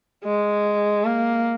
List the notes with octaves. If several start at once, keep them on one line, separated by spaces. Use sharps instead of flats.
G#3
A#3